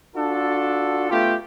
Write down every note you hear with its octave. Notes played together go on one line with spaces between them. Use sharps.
D4 F4 F#4 A4
A3 B3 F4 G4